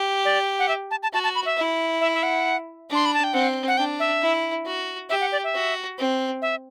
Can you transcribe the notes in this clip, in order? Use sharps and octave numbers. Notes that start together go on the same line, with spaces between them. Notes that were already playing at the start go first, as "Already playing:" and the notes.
Already playing: G4
D5
F#5
E5
A5
A5
F#4 A5
A5
B5
E5
E4
E5
E5
F#5
D4
C6
B5
A5
G5
C4 F#5
F#5
D4 G5
E5
E4
F#4
G4 E5
F#5
D5
E5
F#4
C4
E5